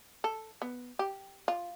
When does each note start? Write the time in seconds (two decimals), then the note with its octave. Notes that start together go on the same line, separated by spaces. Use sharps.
0.24 A4
0.62 B3
0.99 G4
1.48 F4